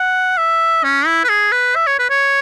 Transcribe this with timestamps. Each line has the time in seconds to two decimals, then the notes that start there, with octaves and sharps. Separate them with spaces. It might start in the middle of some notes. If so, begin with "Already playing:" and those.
Already playing: F#5
0.37 E5
0.84 C#4
1.06 E4
1.24 B4
1.29 G#4
1.52 B4
1.75 E5
1.87 C#5
1.99 B4
2.10 C#5